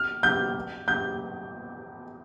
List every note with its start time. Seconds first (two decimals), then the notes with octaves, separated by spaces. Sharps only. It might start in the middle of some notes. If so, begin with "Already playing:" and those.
Already playing: F6
0.23 G6
0.88 G6